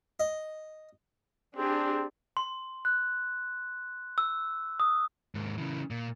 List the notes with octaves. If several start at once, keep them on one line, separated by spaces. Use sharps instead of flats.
D#5
C4 D4 G4 G#4
C6
F#6
E6
D#6
D#2 G#2
C#3 E3
A#2